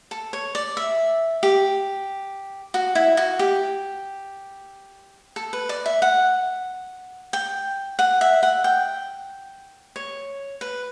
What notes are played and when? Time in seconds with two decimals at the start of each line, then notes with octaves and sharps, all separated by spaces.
0.11 A4
0.33 C#5
0.55 D5
0.77 E5
1.43 G4
2.74 F#4
2.95 E4
3.17 F#4
3.39 G4
5.36 A4
5.53 B4
5.69 D5
5.86 E5
6.02 F#5
7.33 G5
7.99 F#5
8.21 E5
8.43 F#5
8.64 G5
9.96 C#5
10.61 B4